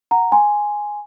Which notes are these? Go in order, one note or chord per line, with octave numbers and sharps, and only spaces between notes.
F#5 A#5
G#5 C6